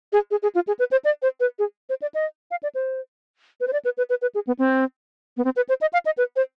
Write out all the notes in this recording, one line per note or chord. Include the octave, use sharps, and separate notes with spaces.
G#4
G#4
G#4
F4
G#4
B4
C5
D5
C5
B4
G#4
C5
D5
D#5
F5
D5
C5
B4
C5
D5
B4
B4
B4
B4
G#4
B3
C4
B3
C4
B4
C5
D#5
F5
D#5
B4
C5